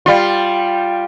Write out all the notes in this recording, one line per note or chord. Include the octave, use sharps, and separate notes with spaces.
G3 F4